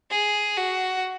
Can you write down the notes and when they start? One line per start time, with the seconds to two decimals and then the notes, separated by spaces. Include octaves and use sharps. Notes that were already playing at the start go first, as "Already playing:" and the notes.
0.11 G#4
0.58 F#4